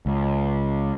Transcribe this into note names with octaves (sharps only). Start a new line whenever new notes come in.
C#2